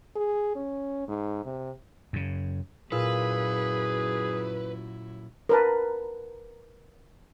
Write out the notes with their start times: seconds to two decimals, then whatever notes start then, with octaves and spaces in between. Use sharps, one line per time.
0.16 G#4
0.56 C#4
1.08 G#2
1.45 C3
2.13 F#2 C#3
2.92 F#2 A#2 E4 F4 G#4 B4 E6
5.49 A#4 B4 A5